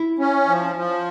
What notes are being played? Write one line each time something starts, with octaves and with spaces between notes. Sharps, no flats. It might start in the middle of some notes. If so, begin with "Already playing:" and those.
Already playing: E4
C#4
F3
F3